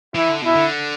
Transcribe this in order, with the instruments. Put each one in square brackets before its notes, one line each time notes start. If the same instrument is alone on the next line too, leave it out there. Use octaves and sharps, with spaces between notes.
[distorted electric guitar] E3 [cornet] E4
[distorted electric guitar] D3
[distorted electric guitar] B2 [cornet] E4
[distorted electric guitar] D3